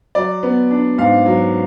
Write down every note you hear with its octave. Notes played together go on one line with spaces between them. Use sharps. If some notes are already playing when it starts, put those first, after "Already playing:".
F#3 D5
B3
D4
G#2 F5
F#3